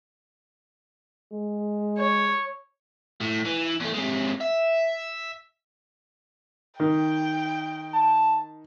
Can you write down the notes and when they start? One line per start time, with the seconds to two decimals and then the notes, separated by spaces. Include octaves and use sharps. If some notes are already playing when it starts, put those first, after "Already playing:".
1.32 G#3
1.98 C#5
3.21 A2
3.45 E3
3.81 E2 A3
3.94 C3 G#3
4.40 E5
6.80 D#3 G5
7.94 A5